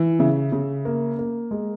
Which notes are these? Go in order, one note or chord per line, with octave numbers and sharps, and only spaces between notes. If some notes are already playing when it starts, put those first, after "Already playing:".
Already playing: E3
C#3 E5
C#3
A#3
A#3
G#3